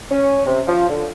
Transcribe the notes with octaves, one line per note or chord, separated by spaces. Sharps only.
C#4
C3
F3
D3